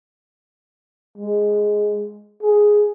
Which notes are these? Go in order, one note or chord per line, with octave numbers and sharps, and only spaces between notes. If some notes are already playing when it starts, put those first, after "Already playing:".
G#3
G#4